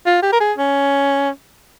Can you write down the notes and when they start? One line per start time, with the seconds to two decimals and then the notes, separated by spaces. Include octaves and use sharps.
0.06 F4
0.22 G4
0.33 A#4
0.40 G#4
0.58 C#4